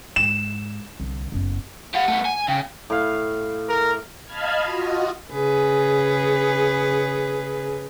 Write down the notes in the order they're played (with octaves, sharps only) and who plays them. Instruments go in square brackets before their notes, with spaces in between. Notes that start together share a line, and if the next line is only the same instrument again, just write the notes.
[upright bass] G#2 [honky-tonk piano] E7
[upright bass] C2 D3
F#1 B3
[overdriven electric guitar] G4 F5 [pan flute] F#5
[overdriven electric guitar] A3 B3
G#5
[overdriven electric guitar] C#3 [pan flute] G5
[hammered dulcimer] A2 F5
[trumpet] A#4
[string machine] D#5 F5 A5 B5 F6 G#6
F4 F#4 D#5
[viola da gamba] C#3 G#4 B4